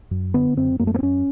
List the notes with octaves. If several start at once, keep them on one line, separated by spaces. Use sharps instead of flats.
F#2
D3 B3
F#2 C4
F#2 A#3
A3
A#3
C4
F#2 C#4